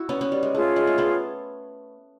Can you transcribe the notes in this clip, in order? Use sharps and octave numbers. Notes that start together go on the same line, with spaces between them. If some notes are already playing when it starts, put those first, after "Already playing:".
Already playing: E4 F#4
B3 C#4
B3 C#4
G3
G#3
A3 F4 G#4 C#5
G#3
A3
A3 B3